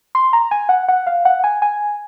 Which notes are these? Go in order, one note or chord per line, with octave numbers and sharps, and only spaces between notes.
C6
A#5
G#5
F#5
F#5
F5
F#5
G#5
G#5